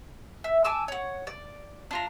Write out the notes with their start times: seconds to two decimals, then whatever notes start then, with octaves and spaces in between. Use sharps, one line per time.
0.44 E5
0.64 G#5 A5 D6 E6
0.88 C#5 F#5
1.27 D5
1.91 D4 F4 A#5